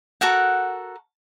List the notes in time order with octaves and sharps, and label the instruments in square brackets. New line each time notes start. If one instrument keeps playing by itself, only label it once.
[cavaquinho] F#4 A4 A#4 F#5